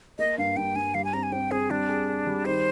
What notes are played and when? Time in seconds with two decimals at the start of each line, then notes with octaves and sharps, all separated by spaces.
0.19 A#3 D#5
0.38 G2 F5
0.57 G2 G5
0.75 G2 G#5
0.94 G3 F5
1.04 G#5
1.13 C4 A#5
1.23 G#5
1.32 C4 G5
1.51 C4 G#4
1.70 G3 D4
1.89 G#4
2.08 G#4
2.27 G3
2.45 D#3 C5